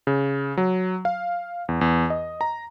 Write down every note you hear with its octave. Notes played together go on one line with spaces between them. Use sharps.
C#3
F#3
F5
E2
E2
D#5
A#5